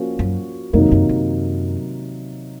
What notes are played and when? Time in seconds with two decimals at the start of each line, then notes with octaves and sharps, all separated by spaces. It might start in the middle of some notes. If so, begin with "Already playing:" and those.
Already playing: F3 A#3 C#4 F#4
0.19 F#2
0.73 F2 C3 D#3 F#3 A#3 D#4
0.92 F#2
1.09 F#2